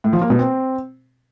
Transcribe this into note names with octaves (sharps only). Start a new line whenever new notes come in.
A2
F3
A#3
B2
C4